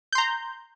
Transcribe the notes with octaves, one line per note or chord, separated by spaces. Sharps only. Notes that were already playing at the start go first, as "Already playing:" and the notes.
A#5 C6 G6